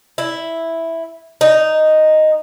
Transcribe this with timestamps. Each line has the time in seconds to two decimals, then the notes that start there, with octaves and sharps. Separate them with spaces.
0.18 E4
1.41 D#4